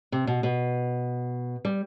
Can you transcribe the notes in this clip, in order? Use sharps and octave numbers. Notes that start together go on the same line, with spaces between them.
C3
B2
B2
G3